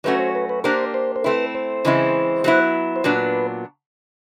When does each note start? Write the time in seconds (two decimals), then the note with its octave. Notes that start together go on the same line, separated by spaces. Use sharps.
0.04 F#3 A3 C#4 F#4 B4
0.19 C5
0.35 B4
0.49 B4
0.64 A#3 D4 G4 A#4 C5
0.94 C5
1.16 C5
1.24 A3 C4 E4 B4
1.55 C5
1.85 C#3 E3 G#3 C4 E4
2.44 F#3 B3 E4
2.96 C5
3.04 A#2 F#3 B3 D4 B4